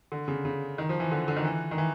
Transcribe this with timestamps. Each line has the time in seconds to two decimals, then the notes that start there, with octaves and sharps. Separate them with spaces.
0.12 D3
0.28 C#3
0.45 C#3
0.78 D#3
0.89 F3
1.00 E3
1.12 D3
1.28 D3
1.37 D#3
1.45 E3
1.71 D#3
1.78 E3